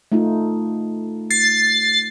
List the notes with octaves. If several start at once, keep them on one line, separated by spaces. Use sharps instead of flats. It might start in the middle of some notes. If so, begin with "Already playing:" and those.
A3 D#4 F4
A6 C7